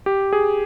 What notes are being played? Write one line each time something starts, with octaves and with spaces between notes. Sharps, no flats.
G4
G#4